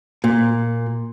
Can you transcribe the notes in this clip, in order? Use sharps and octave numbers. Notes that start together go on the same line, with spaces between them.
A#2